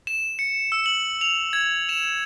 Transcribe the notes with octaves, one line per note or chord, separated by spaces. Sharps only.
E7
C#7
E6
F#7
F7
G#6
E7